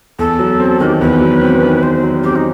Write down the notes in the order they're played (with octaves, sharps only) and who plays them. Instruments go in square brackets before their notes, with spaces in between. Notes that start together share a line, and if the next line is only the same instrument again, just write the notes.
[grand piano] E2 [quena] A4
[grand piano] F#3
C4
[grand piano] D#3 [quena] F#4
[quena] G4
A4
[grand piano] E2 [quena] B4
[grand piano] F#3
C4
D#3
[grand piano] E2 [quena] C5
[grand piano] F#3
[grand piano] C4 [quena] G4
[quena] D#4